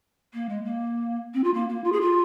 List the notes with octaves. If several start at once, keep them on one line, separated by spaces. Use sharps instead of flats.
A#3
G#3
A#3
C4
F4
A#3
A#3
F4
G#4
F4